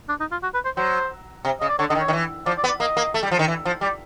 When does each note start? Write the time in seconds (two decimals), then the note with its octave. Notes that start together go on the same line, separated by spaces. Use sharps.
0.09 D4
0.20 D#4
0.32 F4
0.43 F#4
0.54 B4
0.65 C5
0.77 F#3 C5
1.45 C3
1.61 C#3 D#5
1.69 D5
1.79 D3 C#5
1.90 D3 D#5
1.95 D#3
2.01 C#5
2.08 D#3
2.13 E3
2.46 F3 D5
2.57 D5
2.64 B3
2.69 D5
2.80 A#3 D#5
2.97 A#3
3.14 A3
3.23 G3
3.31 F3
3.39 D#3
3.48 E3
3.65 F3
3.81 G3 D5